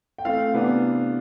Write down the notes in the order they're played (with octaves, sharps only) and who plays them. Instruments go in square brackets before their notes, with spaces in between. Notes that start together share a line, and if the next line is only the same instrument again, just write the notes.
[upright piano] G5
E3 A3 C4 F5
C3 E3 B3 D4